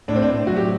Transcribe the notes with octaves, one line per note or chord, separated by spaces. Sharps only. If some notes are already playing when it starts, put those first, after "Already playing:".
A2 D4
C4
D4
A2
F#3 F#4
G4